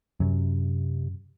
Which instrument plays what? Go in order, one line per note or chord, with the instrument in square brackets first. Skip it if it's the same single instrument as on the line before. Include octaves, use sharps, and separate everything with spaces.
[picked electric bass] F#2 [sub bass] C3